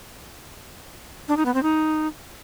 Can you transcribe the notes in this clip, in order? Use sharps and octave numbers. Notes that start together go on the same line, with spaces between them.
D4
D#4
B3
C4
D#4